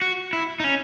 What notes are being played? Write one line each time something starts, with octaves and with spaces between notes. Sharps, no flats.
F#4
E4
D#4
C#4